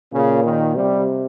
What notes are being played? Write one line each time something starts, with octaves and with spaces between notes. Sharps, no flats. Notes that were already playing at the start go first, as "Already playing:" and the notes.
A#2 C#3
D#3
C3 G3